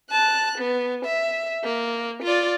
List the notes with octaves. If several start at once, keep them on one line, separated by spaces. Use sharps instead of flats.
A5 F#6
B3
E5
A#3
F4 D5